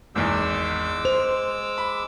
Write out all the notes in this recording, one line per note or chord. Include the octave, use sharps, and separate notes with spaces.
G#1 E2 G#3 D6 E6
C5 F7
B5